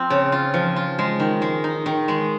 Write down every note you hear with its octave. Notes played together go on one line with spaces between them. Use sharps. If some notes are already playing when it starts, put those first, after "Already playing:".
Already playing: F3 C4
C#3
F4
F3
F4
G#3
D#3
G#3
D#4
D#3
G#3